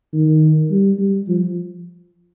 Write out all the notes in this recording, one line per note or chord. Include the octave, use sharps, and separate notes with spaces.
D#3
G3
G3
F3